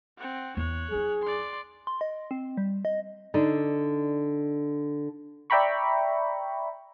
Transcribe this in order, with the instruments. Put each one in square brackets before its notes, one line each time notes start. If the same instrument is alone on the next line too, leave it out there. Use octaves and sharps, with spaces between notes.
[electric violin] C4 F#5
[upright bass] E2 [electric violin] C#5 F#6
[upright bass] F#3 D#4 [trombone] G#4
[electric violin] D5 C6
[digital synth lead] C6
D#5
C4
G3
D#5
[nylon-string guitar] D3 D4 D#4
[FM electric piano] D5 E5 G5 A#5 B5 C#6